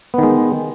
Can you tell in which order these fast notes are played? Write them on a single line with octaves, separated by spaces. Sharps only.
B3 D#3 G#3